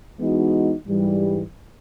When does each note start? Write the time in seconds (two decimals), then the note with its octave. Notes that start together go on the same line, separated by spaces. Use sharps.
0.19 E3 G#3 B3 D#4 F#4
0.87 G#2 E3 G3